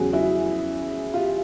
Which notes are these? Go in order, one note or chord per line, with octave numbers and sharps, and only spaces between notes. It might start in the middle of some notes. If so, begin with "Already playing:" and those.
Already playing: E2 C#3 F#3 F#4 G#4
E4 F#4
F4 G4